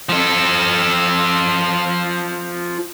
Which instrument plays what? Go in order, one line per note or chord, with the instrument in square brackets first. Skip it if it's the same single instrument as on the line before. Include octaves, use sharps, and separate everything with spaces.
[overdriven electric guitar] F3 A4